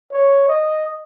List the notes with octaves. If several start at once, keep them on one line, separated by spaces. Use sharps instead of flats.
C#5
D#5